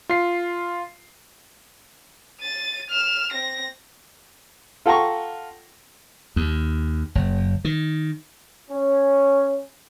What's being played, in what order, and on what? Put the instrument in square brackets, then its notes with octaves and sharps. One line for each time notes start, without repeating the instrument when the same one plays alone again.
[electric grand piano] F4 C7
[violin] A6 D#7
F6 E7
C4 A#6
[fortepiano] F4 A4 F#5 G5 A#5 C#6
[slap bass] D#2
F#1
D#3
[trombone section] C#4